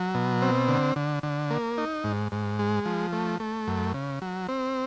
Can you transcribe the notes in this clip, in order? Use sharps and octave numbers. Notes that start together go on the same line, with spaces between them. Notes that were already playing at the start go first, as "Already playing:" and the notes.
Already playing: F#3
B2
C4
D3
D3
D3
A#3
D#4
G#2
G#2
G#3
F3
A3
A3
F#2
C#3
F#3
C4